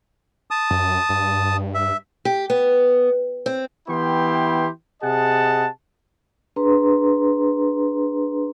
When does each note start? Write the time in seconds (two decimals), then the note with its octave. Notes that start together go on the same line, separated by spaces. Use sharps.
0.51 A5 D#6
0.71 F#2
1.09 G2
1.74 E5
2.25 G4
2.50 B3
3.46 C4
3.88 E3 B3 E4 G4 G5 C6
5.02 C3 G#4 D#5 F#5 A5
6.56 D4 G#4 B4 A#5 C6